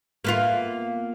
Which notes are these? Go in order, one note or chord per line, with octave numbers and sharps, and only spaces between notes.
A#3 B3 F4